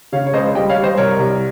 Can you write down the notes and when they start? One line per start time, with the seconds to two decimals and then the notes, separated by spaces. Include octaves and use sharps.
0.12 C#3 C#5 F5
0.27 C#5
0.33 C#2 C5 D#5
0.55 G3 D#5 G5
0.69 C#5 F5
0.76 G3
0.84 C5 D#5
0.97 C2 A#4 C#5
1.19 C2